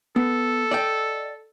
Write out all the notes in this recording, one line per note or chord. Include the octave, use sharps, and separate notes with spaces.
B3 A4
D5 D#5 G5